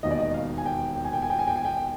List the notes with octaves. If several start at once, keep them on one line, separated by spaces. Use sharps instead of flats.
E1 D#2 D#3 D#5
D5
D#5
F5
G#5
G5
G5
G#5
G5
G#5
G5
G#5
G5
G#5
G5